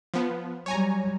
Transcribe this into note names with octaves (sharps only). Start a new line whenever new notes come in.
F3 B3
F#3 G3 C#5 G#5 A#5